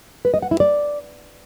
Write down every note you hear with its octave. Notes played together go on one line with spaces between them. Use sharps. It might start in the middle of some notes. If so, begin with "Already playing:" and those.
B4
D#5
F#5
E4
D5